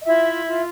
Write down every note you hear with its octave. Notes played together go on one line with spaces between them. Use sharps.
D#5
E4 F4 E5
F4